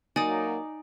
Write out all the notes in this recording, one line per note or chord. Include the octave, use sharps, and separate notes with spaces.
F#3 A#3 D#4 D5 G#5 D#6